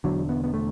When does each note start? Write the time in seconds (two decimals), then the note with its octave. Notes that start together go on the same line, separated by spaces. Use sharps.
0.04 E1 E2 D3 F#3
0.29 B3
0.44 B3
0.54 A3